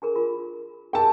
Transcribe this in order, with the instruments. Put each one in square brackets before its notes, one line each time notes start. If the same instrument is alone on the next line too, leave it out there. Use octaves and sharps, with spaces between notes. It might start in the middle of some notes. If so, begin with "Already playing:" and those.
[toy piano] D4 G#4 A#4
F4 A#4
[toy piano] G#4 A#4 E6 [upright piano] G5 A5